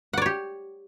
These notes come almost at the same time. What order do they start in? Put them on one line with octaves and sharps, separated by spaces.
F#5 D5 C#5 G4